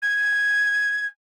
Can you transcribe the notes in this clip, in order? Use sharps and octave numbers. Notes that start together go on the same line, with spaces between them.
G#6